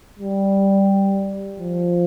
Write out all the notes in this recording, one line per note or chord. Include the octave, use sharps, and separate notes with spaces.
G3
F3